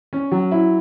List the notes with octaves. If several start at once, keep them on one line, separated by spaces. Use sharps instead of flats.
C#4
F#3
E4